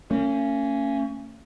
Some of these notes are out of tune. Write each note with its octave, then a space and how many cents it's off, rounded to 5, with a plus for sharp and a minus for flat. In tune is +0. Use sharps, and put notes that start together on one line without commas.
A#3 -45 C#4 +0